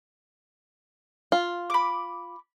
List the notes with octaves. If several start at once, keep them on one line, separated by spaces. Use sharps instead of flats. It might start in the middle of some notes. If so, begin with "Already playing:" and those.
F4
B5 D6